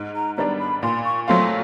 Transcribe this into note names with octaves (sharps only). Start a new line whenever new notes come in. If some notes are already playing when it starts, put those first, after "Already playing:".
Already playing: G#2
A#5
D#3 G3 B3 D4 A#5
B5
A#2 C6
C#6
F#3 A3 C4 F4 C6